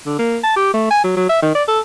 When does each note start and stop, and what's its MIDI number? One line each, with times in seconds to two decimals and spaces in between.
0.06 0.17 50
0.19 0.38 58
0.44 0.55 81
0.56 0.74 67
0.74 0.89 57
0.91 1.03 80
1.04 1.14 54
1.16 1.25 54
1.29 1.41 76
1.42 1.51 51
1.55 1.63 74
1.68 1.80 69